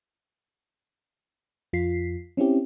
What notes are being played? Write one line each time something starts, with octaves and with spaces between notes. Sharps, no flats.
F2 F4 B6 C7
C4 C#4 E4 G4